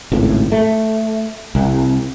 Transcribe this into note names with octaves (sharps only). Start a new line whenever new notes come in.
G#1 C#2 A2
A3
C2